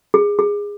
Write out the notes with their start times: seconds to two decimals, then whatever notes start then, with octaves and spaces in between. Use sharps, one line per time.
0.14 G#4
0.39 G#4